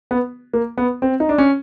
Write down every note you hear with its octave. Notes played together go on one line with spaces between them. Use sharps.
B3
A#3
B3
C4
D#4
D4
C#4